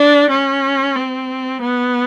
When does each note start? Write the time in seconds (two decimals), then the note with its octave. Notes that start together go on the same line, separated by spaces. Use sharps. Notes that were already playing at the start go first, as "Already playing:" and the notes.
Already playing: D4
0.30 C#4
0.96 C4
1.62 B3